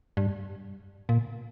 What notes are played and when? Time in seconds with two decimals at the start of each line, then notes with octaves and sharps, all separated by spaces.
0.17 G2
1.09 A#2